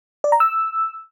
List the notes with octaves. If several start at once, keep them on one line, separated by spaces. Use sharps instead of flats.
D5
A#5
E6